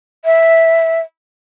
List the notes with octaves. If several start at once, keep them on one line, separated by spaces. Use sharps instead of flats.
E5